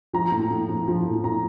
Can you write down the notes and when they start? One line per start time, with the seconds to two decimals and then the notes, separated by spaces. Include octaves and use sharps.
0.13 F3 A#5
0.32 A2
0.50 A2
0.69 F3
0.88 F3
1.05 A2
1.24 A2 A#5